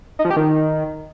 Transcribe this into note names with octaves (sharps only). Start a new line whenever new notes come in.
D#4
F3
G4
D#3